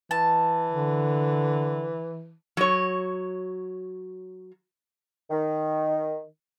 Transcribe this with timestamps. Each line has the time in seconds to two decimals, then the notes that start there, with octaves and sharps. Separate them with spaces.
0.11 E3 A5
0.71 D3
2.57 F#3 C#5
5.30 D#3